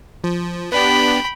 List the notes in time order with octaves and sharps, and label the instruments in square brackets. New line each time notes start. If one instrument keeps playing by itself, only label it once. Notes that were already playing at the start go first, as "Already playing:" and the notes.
[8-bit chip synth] F3
[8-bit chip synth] B3 D4 G4 [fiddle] G5 B5